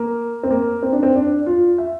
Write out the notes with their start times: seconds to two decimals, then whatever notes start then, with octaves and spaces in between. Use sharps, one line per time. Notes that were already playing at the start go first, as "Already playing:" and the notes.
Already playing: A#3
0.43 C4
0.51 A#3
0.83 C4
0.93 D4
1.03 C4
1.15 D4
1.46 F4
1.78 E5